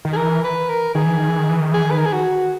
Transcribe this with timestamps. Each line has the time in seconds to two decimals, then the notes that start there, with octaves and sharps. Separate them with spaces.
0.05 D#3
0.13 G#4
0.16 E3 A#4
0.44 B4
0.69 A#4
0.95 D#3 G#4
1.06 E3
1.17 D#3
1.28 E3
1.39 D#3
1.49 E3
1.60 D#3
1.72 E3 G#4
1.83 D#3
1.91 B4
1.98 A#4
2.06 G#4
2.13 F#4